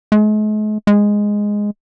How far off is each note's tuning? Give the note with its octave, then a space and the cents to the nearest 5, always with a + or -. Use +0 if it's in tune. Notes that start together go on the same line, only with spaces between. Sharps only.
G#3 +45
G#3 -5